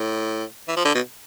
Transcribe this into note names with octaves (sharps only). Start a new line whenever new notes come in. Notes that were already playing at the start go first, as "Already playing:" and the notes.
Already playing: A2
E3
F3
D3
B2